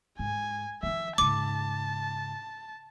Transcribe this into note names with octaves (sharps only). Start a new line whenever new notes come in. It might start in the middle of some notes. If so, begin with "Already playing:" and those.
G#2 G#5
D#3 F3 E5
G#2 C#3 A5 D6